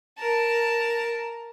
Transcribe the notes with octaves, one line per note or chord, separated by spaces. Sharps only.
A#4 A5